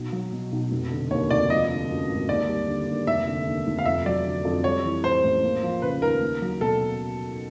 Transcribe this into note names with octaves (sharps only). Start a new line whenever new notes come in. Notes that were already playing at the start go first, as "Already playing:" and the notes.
Already playing: B1
F#3
B2
B1
F1
D3
D#2 C#5
F1 D5
F3 D#5
D3
F#2
G#1
D#2 D5
G3
D3
D#2
F1 E5
D3
D#2
F1
F5
F2 E5
F#3 D5
D3
F2
G3 C#5
E3
A2 C5
A1
A#3
F3
C#3 B4
D#2 A#4
A#3
F#3
B2 A4